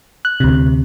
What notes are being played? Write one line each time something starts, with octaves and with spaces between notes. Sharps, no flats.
F#6
D2 C3